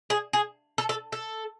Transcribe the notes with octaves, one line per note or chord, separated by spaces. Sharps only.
G#4
G#4
A4
A4
A4